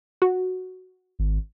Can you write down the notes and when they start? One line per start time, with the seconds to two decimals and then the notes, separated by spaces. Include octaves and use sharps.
0.22 F#4
1.19 G#1